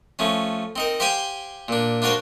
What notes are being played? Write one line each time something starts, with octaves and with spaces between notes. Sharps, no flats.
F3 A3 C#4
C4 D#4 A#4
G4 C5 F5 G5 G#5
A#2 D4
D4 F4 F#4 A#4 C5